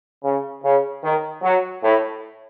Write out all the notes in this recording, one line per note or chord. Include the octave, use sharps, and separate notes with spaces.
C#3
C#3
D#3
F#3
A2